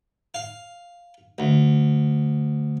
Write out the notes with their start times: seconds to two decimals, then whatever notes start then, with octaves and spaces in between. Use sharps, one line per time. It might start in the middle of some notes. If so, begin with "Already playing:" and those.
0.34 F5
1.39 D2